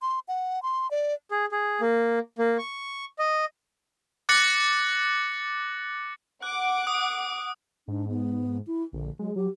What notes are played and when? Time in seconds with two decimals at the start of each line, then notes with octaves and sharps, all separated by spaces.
0.02 C6
0.28 F#5
0.63 C6
0.91 D5
1.30 G#4
1.52 G#4
1.81 A#3
2.39 A#3
2.58 C#6
3.19 D#5
4.29 D6 F#6 A6 A#6 C#7 F#7
6.42 F#5 D6 F#6
6.87 D#6
7.88 G#2 D4
8.08 B3
8.67 E4
8.93 A#1 D3
9.19 F#3 G#3
9.36 F#3 G4